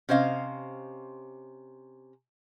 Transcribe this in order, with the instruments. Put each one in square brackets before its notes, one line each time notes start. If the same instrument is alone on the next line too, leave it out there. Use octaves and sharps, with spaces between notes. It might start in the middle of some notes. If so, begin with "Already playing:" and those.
[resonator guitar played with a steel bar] C3 C#4 C5 D#5 F5